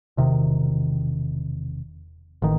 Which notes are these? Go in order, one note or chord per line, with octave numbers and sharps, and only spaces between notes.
E1 C3 D#3
A1 D#3